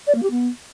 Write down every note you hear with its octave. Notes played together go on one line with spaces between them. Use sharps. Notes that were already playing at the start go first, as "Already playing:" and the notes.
D5
A#3
G4
B3